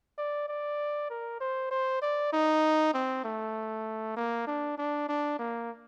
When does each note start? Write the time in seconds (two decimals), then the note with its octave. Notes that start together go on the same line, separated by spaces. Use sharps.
0.18 D5
0.49 D5
1.10 A#4
1.41 C5
1.71 C5
2.02 D5
2.33 D#4
2.94 C4
3.24 A3
4.17 A#3
4.47 D4
4.78 D4
5.09 D4
5.39 A#3